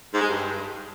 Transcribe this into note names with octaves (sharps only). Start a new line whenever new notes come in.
G#2
G#3
G2